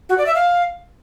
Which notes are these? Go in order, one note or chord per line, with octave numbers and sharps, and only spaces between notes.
F#4
D5
E5
F5